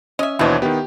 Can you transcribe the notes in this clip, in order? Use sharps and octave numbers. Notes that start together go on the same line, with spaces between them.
C#4 D#5 E5
D#2 B2 E3 D4 E4 C5 C#5 D#5
D#3 B3 G4